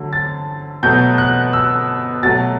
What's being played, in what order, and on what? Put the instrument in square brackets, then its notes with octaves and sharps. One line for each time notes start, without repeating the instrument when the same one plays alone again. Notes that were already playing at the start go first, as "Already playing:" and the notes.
Already playing: [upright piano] D3 F#3 A3
A6
B2 F#3 A3 G6
F#6
E6
B2 F#3 A3 A6